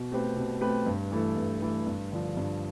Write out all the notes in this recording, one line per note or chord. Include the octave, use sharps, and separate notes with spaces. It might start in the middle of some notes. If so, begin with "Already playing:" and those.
Already playing: B2
A3 C4 G4 B4
B2
A3 C4 G4 B4
G2
E3 A3 E4 A4
G2
E3 A3 E4 A4
G2
D3 F3
G2